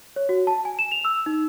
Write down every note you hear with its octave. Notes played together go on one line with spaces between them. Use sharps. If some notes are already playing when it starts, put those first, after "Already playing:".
C#5
F#4
A5
G#5
E7
F7
E6
D#4